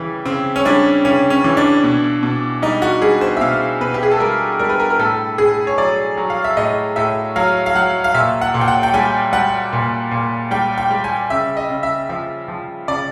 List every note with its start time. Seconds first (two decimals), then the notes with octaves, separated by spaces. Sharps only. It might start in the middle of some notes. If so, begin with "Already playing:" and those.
Already playing: C#3 E3 G3
0.25 C#3 C4
0.56 C#4
0.65 G3 D4
1.05 C#3 C#4
1.30 C#4
1.44 E3
1.57 D4
1.84 B2
2.23 B2
2.62 G3 D#4
2.82 F#4
3.02 G3 G#4
3.21 C5
3.37 E5
3.41 B2 F5
3.81 B2 B4
3.94 G4
4.03 G#4
4.12 A4
4.20 G3 A#4
4.59 G3 A#4
4.69 B4
4.80 A#4
4.90 A#4
4.99 A2 A4
5.38 A2 G#4
5.67 C#5
5.78 F#3 D5
6.17 F#3
6.30 F5
6.44 E5
6.57 A2 D#5
6.96 A2 E5
7.36 F#3 F5
7.66 F5
7.75 F#3 F#5
8.04 F5
8.14 A#2 E5
8.41 F#5
8.54 A#2
8.61 G5
8.68 F#5
8.83 G5
8.94 G3 G#5
9.33 G3 F#5
9.73 A#2
10.11 A#2
10.51 G3 G5
10.78 G5
10.91 G3
11.04 G#5
11.30 C#3 E5
11.57 D#5
11.70 C#3
11.83 E5
12.09 F3 E5
12.48 F3
12.88 C#3 D5